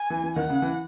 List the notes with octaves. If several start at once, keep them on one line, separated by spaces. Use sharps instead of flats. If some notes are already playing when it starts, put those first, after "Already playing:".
Already playing: G#5
E3
E3
D#3 F#5
C#3
E3